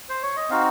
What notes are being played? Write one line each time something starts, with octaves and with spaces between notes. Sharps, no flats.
C5
C#5
D#5
C4 D#4 F#4 F5